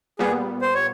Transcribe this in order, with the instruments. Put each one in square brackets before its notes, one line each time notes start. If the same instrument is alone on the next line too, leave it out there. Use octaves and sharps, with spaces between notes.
[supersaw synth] A#2 G3 B3 [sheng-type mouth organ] G#4
[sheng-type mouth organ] C5
C#5